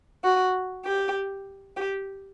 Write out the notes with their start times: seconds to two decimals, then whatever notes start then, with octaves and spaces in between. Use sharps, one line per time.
0.24 F#4
0.85 G4
1.76 G4